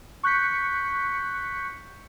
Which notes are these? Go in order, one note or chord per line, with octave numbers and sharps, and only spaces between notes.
C#6 F#6 G6 B6 C#7